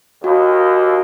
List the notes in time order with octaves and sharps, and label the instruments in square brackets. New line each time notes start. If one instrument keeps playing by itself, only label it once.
[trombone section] D#2 [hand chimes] F#4